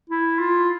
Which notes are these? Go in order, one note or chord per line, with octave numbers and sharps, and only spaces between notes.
E4
F4